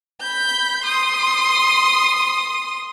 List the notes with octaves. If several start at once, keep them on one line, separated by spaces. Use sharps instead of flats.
B5 G6
C6 D#6